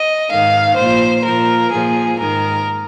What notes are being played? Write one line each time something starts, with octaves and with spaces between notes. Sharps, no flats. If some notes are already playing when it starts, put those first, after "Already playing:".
Already playing: D#5
G#2 D#3 F5
A#2 F3 C5
A#2 F3 A#4
A#2 F3 G#4
G#2 D#3 A#4